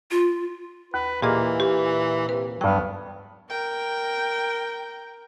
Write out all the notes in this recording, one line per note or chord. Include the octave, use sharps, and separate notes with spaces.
F4
D#2 B4
A#2 E3 A#3 G4 G#4 D#5
G4
C3 B4
D2 G2 F#3 B3 G5
A#4 G5